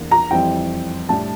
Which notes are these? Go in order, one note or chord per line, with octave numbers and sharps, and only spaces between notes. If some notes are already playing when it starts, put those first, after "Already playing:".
Already playing: E2 E3 A#3 D4
A#5
F2 E3 G3 C4 E4 G5
A2 G3 D4 A5